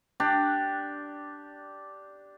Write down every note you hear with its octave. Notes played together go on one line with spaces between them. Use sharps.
D4 G4